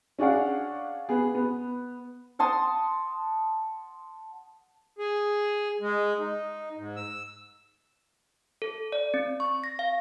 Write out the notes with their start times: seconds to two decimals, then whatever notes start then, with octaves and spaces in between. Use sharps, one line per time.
0.18 C#4 D4 G#4 F5 F#5
1.09 B3 G#4
1.35 B3
2.39 F#5 A5 C6 D#6
4.99 G#4
5.81 G#3
6.19 D#4
6.77 G#2
6.96 E6
8.62 A4
8.92 D5
9.14 C4
9.40 C#6
9.64 A#6
9.79 F5